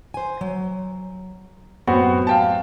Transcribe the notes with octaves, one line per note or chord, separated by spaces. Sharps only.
C5 G#5
F#3
F#2 A2 B3 C4 F#4
F5 G5 A5